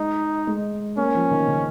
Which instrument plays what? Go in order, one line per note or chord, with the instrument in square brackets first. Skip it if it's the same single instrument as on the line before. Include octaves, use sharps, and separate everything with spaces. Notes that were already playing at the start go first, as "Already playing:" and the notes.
Already playing: [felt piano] G#3 [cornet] D#4
[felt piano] G#3
[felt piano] A#3 [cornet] C#4
[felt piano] F3
D#3
C#3